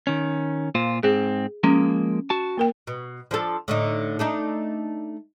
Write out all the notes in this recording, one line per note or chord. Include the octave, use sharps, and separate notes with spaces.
D#3 C#4
A#2 F4 C5
G#2 C4 G#4
F3 G#3 A#3 C#4
F#4 A5
A#3 A#4 G5
B2
F3 D4 A4
A2 D3 D#4
A3 D4 D#4